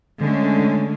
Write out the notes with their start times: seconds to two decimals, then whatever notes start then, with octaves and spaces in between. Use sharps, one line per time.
0.20 D3 G#3 A3 C#4